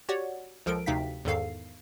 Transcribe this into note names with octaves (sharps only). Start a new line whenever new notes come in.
F#4 G4 C#5 D5 F#5
C#2 F3 A4 A#4 D7
D2 C3 D#4 F5 G5 B6
E2 G#2 D#3 A4 F5 C7